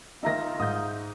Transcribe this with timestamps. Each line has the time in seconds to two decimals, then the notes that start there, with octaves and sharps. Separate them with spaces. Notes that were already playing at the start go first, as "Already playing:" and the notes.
0.23 D#3 D#4 F4 E5 A#5 A#6
0.60 G#2 D#6 G6